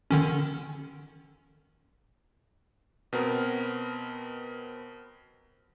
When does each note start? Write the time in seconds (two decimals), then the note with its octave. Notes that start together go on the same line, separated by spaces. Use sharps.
0.11 D3 D#3 C#4
3.13 B2 B3 C4 A#4